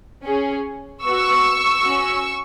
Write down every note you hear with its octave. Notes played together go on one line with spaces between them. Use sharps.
C#4 G#4
B3 F#4 C#6 E6
C#4 F#4